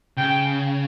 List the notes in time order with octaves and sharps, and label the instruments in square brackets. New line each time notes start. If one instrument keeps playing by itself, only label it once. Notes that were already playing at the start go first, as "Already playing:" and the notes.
[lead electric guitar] C#3 [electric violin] G5